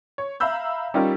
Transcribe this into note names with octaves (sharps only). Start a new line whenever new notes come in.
C#5
E5 F5 A#5 B5 E6 G6
G3 C#4 D#4 F4 G4 A#4